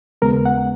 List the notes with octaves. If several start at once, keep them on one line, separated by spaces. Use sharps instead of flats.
D#2 C#3 G#3 B3 A#4
F#5